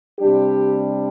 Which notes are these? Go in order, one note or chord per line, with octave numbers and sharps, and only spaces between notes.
C3 G3 D4 G4